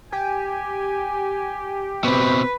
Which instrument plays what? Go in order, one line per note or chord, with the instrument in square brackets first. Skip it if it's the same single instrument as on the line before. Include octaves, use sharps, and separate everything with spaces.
[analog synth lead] G4 [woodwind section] G#5
[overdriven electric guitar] B2 C4 [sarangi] B4 [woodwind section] C5